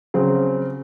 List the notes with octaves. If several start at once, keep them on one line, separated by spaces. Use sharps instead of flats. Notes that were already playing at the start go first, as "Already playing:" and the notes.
C#3 F#3 C4